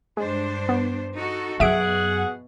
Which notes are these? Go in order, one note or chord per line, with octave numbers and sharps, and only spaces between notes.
G2 G#3 D4 C5
B3
D#4 F#4 A4
F#2 B2 G#4 E5 F#5 D7